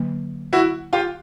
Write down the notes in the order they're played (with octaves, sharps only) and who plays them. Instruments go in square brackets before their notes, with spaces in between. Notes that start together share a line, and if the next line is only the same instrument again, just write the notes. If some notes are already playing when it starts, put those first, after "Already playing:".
Already playing: [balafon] D3 F#3 A#3
[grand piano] E4 F#4
F4 G4